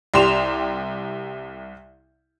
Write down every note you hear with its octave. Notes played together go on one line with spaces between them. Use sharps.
C2 G4 C6 E7 F7